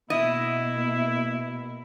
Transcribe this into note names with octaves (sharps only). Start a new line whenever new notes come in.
B2 A#3 E4 D#5 E5